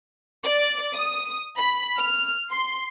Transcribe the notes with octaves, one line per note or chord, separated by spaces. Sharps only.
D5
D#6
B5
F6
C6